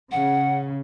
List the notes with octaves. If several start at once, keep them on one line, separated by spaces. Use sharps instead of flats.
C#3 F#5